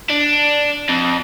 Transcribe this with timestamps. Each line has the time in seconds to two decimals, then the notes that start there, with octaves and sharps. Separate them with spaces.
0.10 D4
0.89 F2